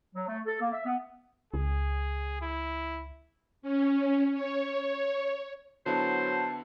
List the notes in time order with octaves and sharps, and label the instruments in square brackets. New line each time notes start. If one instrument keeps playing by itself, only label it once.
[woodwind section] F#3
A3
A4
A#3
E5
B3
[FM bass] C#2 [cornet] G#4
[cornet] E4
[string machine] C#4
C#5
[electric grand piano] D3 B3 E4 [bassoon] F#3 [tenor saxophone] C5 [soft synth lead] A5